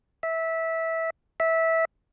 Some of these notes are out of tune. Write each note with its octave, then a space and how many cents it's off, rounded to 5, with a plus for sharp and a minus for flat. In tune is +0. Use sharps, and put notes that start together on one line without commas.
E5 -15
E5 -15